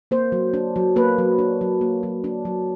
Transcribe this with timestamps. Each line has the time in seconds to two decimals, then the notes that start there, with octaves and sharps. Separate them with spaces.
0.11 A#3 C5
0.32 F#3
0.54 D4
0.76 F#3
0.96 A#3 B4
1.18 F#3
1.39 D4
1.61 F#3
1.81 A#3
2.03 F#3
2.24 D4
2.45 F#3